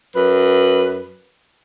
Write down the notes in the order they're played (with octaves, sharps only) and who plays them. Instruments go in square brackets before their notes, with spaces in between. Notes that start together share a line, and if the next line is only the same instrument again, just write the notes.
[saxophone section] F#2 B4